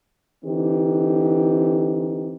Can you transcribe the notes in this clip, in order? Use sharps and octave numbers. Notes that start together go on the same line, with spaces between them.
D3 E3 C4 D#4 G4